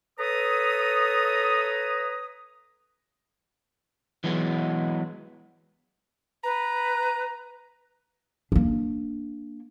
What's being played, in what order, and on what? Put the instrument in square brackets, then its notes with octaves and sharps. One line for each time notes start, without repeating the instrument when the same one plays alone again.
[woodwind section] A4 B4 C#5 A#5 D#6
[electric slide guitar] E3 F#3 G#3 B3
[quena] B4 [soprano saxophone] A#5
[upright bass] A#3 D4